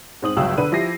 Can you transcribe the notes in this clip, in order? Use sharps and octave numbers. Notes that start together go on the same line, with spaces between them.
G#2 C4 D#6 F#7
G1 C#2 F#3 F5 G5 E6
D3 B4 D#7
F3 E4 G4 A#6 C7